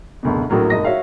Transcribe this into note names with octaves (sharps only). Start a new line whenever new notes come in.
F#1 D2 B2
A#1 A2 F#3 A#4
F#1 G#2 A#3 D#5 A#6
F#4 C#5 E5 F5